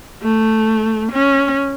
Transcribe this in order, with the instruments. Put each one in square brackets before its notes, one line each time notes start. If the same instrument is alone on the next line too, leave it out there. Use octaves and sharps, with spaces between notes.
[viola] A3
C#4